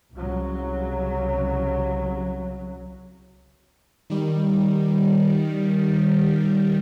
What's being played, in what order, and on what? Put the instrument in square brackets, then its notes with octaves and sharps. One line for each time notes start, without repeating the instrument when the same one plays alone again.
[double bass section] C2 C#3 F#3
[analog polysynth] D#3 G3